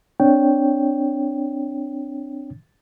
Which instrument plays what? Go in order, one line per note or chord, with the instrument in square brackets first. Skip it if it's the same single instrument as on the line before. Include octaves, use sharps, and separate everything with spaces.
[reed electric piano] C4 D4 C#5 G5